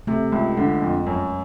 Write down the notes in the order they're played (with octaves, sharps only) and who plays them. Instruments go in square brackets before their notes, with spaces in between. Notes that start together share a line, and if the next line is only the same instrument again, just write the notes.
[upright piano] C3 [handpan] A3
[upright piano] C#2 [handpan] G#3
[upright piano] D3 [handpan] G#3
[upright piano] F2
F#2